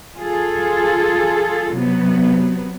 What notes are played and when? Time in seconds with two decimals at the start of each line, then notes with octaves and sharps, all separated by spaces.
0.19 F4 G#4 A4
1.74 C3 F#3 B3